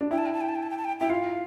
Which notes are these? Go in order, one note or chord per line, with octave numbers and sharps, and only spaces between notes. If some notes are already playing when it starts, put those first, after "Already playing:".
D4
E4 G5
A5
G5
A5
G5
A5
G5
A5
G5
A5
G5
E4 G5
F4 F5